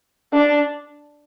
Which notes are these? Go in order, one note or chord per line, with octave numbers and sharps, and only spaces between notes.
D4